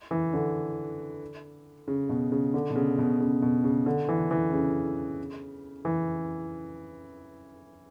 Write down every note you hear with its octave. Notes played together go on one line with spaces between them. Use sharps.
E3
D3
C#3
B2
C#3
D3
B2
C#3
B2
C#3
B2
C#3
D3
E3
E3
C#3
E3